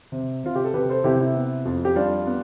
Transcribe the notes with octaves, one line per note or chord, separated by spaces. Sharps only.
C3
C3 F4
G4
A4
C3 G4 B4
A4 C5
C3 E4 G4
E4
B3
F2
G4
G3 D4 F4
B3